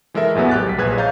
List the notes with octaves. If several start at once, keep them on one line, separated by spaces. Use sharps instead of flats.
E3 G#3 A4 A#4 E5
A1 E2 F#3 B3
G4 F#6 A6
C2 B6
A#1 G#4 B4 F#6 G#6
C#5 D#5 F5 A#5 G6 A6